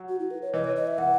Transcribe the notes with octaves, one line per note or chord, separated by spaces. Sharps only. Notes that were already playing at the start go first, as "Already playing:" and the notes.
Already playing: F#3
F#4
E4
B4
C#5
E3 D#5
C#5
D#5
E5
E3 F#5